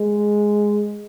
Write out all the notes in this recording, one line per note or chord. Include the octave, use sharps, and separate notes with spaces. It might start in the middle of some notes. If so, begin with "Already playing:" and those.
Already playing: G#3